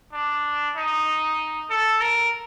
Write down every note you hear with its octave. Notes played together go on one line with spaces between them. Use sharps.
D4
D#4
A4
A#4